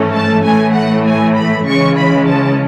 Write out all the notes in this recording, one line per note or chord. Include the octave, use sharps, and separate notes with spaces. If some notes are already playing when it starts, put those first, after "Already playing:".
Already playing: G#2 E3 A3 C#4
A5
A2 E3 A3 G#5
F#5
G#5
B5
C#3 E3 G#3 C#4 C#6
B5
A5